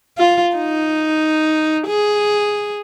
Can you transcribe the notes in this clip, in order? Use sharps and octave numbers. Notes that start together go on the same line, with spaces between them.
F4
D#4
G#4